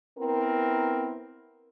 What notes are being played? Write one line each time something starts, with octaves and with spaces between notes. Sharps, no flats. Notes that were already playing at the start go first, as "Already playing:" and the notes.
B3 C4 E4 A#4